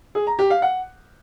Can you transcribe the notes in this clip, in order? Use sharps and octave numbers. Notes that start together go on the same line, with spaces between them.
G#4
A#5
G4
F5
F#5